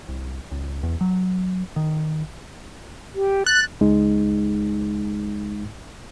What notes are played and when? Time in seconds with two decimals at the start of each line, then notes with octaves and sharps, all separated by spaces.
0.08 C2
0.51 C#2
0.83 E2
1.01 F#3
1.76 D#3
3.15 G4
3.46 F#6 A6
3.81 C#2 G#3 D#4